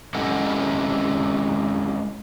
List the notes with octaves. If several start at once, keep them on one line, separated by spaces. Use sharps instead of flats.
G#3 C#4 E4 G4 A4 F#5